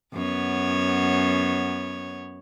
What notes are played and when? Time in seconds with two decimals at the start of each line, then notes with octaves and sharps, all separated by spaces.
0.13 F#2 B3 C#5